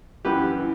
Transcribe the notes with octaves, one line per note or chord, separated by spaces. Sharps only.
F#2 E3 G4 B4
E3